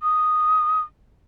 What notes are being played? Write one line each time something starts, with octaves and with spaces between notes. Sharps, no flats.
D#6